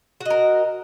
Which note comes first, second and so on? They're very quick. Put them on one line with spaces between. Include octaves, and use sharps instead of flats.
F#4 D#5 A#4